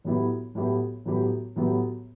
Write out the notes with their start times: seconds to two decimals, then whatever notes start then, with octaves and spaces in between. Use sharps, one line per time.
0.04 A2 F#3 B3 E4 G4
0.55 A2 F#3 B3 E4 G4
1.05 A2 F#3 B3 E4 G4
1.56 A2 F#3 B3 E4 G4